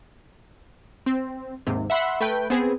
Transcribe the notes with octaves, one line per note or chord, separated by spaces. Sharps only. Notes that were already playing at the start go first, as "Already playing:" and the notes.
C4
D#2 G#2 C3
E5 F#5 B5 C6
A3 B4 G5
B3 C4 G#4